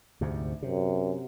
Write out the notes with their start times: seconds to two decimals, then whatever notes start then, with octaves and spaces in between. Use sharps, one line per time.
0.21 D2 G#2 C3
0.62 F#2 C3